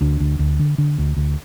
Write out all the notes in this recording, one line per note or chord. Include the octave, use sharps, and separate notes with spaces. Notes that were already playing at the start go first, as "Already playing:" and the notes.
D2 D4
D2
D2
D3
D3
D2
D2